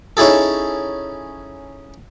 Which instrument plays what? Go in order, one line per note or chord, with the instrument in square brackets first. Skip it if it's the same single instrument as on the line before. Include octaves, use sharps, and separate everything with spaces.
[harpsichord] C#4 D#4 E4 G#4 A4